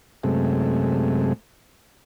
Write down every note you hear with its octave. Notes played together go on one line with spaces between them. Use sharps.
F#2 C3 G#3 A3